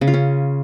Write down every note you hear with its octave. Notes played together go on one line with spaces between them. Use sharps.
C#3
F4
C#4